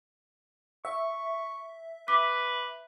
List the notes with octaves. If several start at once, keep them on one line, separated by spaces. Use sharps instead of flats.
E5 C#6
B4 D6 B6